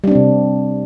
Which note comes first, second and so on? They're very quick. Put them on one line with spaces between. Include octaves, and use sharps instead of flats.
G3 D4 C4 C3